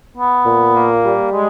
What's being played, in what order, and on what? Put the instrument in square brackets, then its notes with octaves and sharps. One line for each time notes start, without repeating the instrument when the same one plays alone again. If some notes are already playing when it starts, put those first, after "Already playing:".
[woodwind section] B3
A#2
A#3
G3
G#3